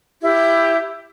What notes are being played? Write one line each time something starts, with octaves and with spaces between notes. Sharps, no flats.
E4 G4